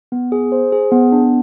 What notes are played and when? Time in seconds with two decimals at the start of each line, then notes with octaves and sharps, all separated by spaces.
0.12 B3
0.32 G#4
0.52 C5
0.72 G#4
0.91 B3
1.12 D4